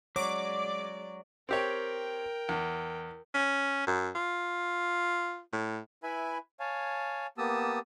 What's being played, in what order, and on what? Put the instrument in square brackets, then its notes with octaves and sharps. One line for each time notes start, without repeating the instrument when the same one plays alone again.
[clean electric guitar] F#3 [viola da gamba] G#3 D5 [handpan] C#5 [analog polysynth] D6
[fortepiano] C4 G4 C#5 [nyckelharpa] A#4 G5
[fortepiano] E2
[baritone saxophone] C#4
F#2
F4
A2
[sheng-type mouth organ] E4 B4 E5 G#5 B5
C#5 F5 G#5 A5
A#3 B3 G4 A5 D#6 E6